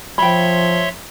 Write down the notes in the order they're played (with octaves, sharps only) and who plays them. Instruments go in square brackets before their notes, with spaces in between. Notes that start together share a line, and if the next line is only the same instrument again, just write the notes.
[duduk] F3 [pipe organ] C#5 E5 C6 [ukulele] G5 B5